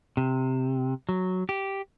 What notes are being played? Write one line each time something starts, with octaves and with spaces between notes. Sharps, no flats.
C3
F#3
G4